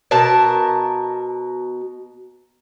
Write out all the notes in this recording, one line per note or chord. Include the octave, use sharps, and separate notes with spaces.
B2 A#4 A5